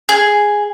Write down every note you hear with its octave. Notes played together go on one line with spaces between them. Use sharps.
G#4